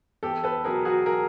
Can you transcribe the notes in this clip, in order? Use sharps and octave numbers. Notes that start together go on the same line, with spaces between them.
E2 G4 A4
A4 B4
B2 F#3 B3 G#4 A#4
F#4 G#4
G#4 A#4